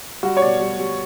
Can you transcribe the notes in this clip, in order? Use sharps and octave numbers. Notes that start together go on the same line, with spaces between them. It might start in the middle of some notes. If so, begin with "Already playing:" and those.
G3 F#4
C#5
B2 D5
G3
G3